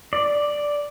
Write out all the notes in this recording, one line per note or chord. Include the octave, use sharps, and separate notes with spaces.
D5